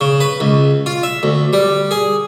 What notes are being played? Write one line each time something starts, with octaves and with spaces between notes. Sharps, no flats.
C#3
B4
C#2
F4
E5
D2
G3
G#4